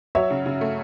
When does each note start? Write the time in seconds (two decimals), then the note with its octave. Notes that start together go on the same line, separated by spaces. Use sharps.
0.15 F#3 C#5 E5
0.31 C#3
0.46 C#3
0.61 A3